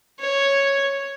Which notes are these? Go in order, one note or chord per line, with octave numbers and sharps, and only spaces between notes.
C#5